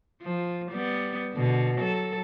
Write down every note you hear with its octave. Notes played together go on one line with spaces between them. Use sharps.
F3
G3 B3
B2 D3
F#3 A4